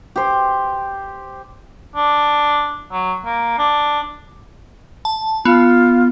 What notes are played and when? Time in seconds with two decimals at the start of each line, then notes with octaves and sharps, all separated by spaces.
0.16 G4 C5
1.96 D4
2.91 F#3
3.25 A#3
3.58 D4
5.05 A5
5.45 B3 F4